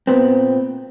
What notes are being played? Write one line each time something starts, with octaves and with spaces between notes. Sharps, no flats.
A#2 B3 C4